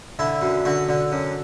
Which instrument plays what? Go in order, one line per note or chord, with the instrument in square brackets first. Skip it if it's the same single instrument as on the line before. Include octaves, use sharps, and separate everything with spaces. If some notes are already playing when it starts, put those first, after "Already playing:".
[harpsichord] D3 E4
F#2
D3 F#4
D3
F#2